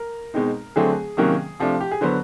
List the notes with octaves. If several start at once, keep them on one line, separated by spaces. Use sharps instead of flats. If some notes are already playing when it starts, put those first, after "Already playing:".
Already playing: A#4
B2 G#3 C4 D#4
D3 F#3 A3 C4 G#4
C3 D#3 F#3 A#3 C#4
C3 F3 A3 D4
G4
G#4
D3 F#3 B3 C5